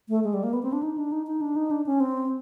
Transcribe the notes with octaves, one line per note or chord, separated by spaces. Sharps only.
A3
G#3
G3
A#3
B3
C4
D4
D#4
D4
D#4
D#4
D4
D#4
D4
C#4
C4